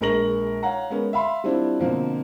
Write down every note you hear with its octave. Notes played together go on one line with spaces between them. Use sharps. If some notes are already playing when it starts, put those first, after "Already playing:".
A#1 G#3 A#4 C#6 A#6 F#7
C#5 F5 F#5 A#5
G#3 B3 C#4 A#4
E5 F5 B5 C6
G3 C4 D4 E4 F4
B2 D3 F3 A#3 C4